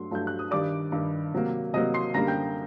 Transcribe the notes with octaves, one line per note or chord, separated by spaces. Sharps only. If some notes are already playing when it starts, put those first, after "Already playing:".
Already playing: G2 F#3 A3 C6
G2 F#3 A3 G6
F#6
D#6
G2 D#3 G3 D5 D6
G2 D#3 G3
C3 F#3 A#3
C3 F#3 A#3 D#5 D#6
C6 C7
F#2 D3 G3 A#3 A#5 A#6
G5 G6